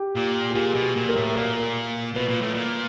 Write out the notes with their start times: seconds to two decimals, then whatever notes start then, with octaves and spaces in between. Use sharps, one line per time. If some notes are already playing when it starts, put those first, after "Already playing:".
Already playing: G4
0.15 A#2
0.50 G#4
0.55 A#2 G4
0.75 B2
0.82 F#4
0.96 A#2
1.09 A#4
1.16 A2
1.36 A#2 A#4
2.15 B2 B4
2.29 A#2
2.42 A2
2.55 A#2